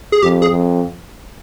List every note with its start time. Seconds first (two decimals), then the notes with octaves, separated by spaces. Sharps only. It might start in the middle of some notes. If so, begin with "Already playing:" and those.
0.12 G#4
0.22 F2 G4
0.42 G#4
0.51 F2